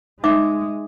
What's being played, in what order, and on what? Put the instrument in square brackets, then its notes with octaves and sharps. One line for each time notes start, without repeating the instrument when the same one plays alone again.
[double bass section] G#3 [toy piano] D#4 E5 D6